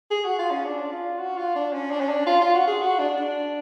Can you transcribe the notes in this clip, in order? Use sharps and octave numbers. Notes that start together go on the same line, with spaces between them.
G#4
F#4
F4
C#4
D4
F4
F#4
F4
D4
C#4
D4
C#4
D4
F4
F4
F#4
G#4
F#4
D4
D4